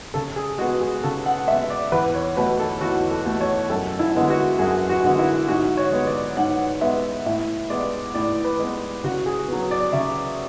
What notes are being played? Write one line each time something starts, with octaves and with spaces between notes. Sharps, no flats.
C#3 A4
G#4
G#3 B3 F#4
G#4
C#3 A4
F#5
G#3 B3 E5
D5
E2 B4
C#5
B2 A3 B4
A4
E2 F#4
A4
B2 A3
C#5
F#2 A4
E4
D3 G#3 B3
F#4
F#2 G#4
F#4
D3 G#3 B3
E4
G#2 F#4
C#5
G#3 B3
D5
G#2 F#5
G#3 B3 E5
A2 E5
G#3 B3 D5
A2 D5
B4
G#3 B3
C#3 F#4
G#4
F#3 B3
D5
C#3 E5